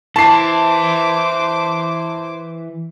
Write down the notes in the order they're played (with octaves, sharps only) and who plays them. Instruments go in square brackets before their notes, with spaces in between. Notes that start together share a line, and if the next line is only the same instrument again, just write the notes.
[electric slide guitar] E3 E4 [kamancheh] C5 D6 [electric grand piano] A5 C7